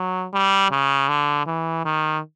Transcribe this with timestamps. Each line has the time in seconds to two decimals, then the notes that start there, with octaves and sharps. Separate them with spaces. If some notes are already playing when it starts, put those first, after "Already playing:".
Already playing: F#3
0.33 G3
0.71 C#3
1.08 D3
1.46 E3
1.85 D#3